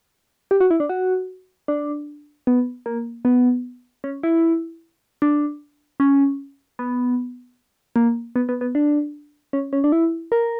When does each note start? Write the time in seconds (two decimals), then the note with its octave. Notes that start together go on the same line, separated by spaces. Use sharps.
0.51 G4
0.60 F#4
0.71 E4
0.80 D4
0.89 F#4
1.68 D4
2.47 B3
2.86 A#3
3.25 B3
4.04 C#4
4.23 E4
5.22 D4
6.00 C#4
6.79 B3
7.96 A#3
8.36 B3
8.49 B3
8.61 B3
8.75 D4
9.53 C#4
9.73 C#4
9.84 D4
9.92 E4
10.32 A#4